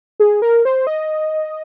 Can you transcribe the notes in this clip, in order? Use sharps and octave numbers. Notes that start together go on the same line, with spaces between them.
G#4
A#4
C5
D#5